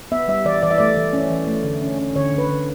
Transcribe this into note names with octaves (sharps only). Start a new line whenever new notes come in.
B3 E5
G3 E5
E3 D5
E3 D5
E5
A3 D5
E3
C#4
E3
A3
D3
C#4
C#4
D3 C#5
D3
B4
D3